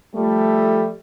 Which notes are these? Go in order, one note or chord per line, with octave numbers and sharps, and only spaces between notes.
F3 G3 A3